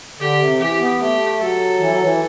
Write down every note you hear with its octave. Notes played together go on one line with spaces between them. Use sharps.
D3 G4
C3
E3 G4
B3
A3 G4
F#3 A4
E3
F#3
E3